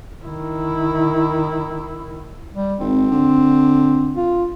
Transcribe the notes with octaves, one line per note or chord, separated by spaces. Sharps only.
D#3 E4
G3
G#1 C4
D3
F4